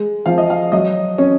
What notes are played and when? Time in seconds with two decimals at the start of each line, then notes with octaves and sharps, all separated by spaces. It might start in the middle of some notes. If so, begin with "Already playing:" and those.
Already playing: G#3
0.26 F3 F5
0.38 D#5
0.50 F5
0.72 F#3 D#5
1.18 C#4